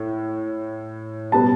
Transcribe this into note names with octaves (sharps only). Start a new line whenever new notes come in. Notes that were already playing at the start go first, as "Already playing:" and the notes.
Already playing: A2
B2 G3 B3 A5